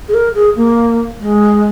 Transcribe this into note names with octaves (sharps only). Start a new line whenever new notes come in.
G#4
A#4
G#4
A#3
G#3